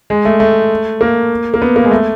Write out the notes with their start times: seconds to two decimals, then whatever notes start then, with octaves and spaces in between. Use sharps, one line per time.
0.10 G#3
0.25 A3
0.40 A3
1.01 A#3
1.54 A#3
1.62 B3
1.76 A#3
1.85 G#3
1.91 A3